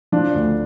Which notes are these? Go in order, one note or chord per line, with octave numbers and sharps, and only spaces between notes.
F3 D4
D2